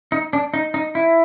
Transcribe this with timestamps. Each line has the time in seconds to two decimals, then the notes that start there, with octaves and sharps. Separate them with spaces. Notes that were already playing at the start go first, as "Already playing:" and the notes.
0.12 D#4
0.33 D4
0.54 D#4
0.74 D#4
0.95 E4